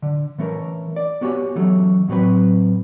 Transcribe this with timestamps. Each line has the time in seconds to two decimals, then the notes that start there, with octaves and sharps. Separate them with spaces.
0.02 D3
0.38 E3 A3 C#4 A#4
0.96 D5
1.21 B3 F#4 G4 C#5 G#5
1.56 E3 F#3 A3 C#4
2.08 A2 F#3 C4 B4